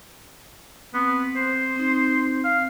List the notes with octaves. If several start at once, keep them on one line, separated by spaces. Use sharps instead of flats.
B3 C4
C5
C4 D#4
F5